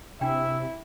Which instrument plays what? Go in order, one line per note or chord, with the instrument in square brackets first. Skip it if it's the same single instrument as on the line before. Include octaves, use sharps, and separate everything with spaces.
[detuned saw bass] C3 [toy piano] D4 G5 [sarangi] E4 [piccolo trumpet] E5